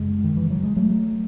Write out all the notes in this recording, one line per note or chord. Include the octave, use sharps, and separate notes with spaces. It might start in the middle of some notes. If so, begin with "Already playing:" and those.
Already playing: F#2 C#3 G#3
D#3
E3
F#3
G#3
F#3 A3